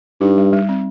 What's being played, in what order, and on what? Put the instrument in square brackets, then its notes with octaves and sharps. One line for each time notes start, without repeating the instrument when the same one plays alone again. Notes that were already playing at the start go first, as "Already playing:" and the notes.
[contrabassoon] G2 [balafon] D#4
[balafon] G3
G3
C4